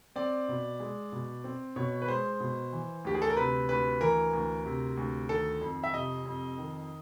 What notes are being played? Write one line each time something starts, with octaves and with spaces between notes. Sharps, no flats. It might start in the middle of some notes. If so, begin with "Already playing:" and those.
C4 D5
B2
G#3
B2
C4
B2 C#5
B4
G#3 C5
B2
E3
D2 G4
G#4
A4
A#4
C3 B4
D2 B4
E3 A#4
D2
C3
D2
D#3 A4
F2
E5
C3 D#5
F2
D#3